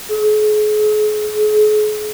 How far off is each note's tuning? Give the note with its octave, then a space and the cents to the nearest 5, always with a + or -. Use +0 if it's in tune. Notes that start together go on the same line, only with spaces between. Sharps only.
G#4 +40